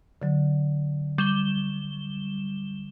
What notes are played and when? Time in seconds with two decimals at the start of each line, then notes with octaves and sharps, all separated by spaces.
0.22 D3 F#3
1.18 G3 E7 G7